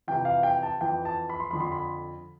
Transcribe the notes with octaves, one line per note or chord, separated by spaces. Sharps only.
F2 C3 E3 G5
F5
G5
A5
F2 E3 G5
A5
B5
C6
F2 D3 B5
C6
B5